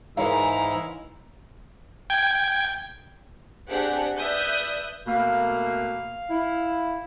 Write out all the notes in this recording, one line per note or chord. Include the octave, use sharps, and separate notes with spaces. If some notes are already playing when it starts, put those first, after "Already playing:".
G#2 E3 G#3 E4 A#4 C#5 F5 A#5
G5 G#6
C4 D4 G4 G#4 F#5
B4 D5 E5 D#6 F#6 G6
B2 A3 A#3 F5
E4